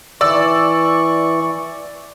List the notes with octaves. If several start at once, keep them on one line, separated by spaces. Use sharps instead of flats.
E3 D5 C#6 E6